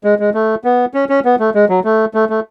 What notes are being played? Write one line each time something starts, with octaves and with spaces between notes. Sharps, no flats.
G#3
G#3
A3
B3
C#4
C#4
B3
A3
G#3
F#3
A3
A3
A3